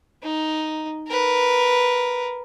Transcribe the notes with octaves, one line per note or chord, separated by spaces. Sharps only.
D#4
A#4 B4